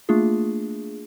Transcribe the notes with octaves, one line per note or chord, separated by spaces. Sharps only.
A3 A#3 D4 F4 G#4